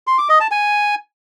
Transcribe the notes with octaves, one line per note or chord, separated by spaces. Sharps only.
C6
D6
D#5
A5
G#5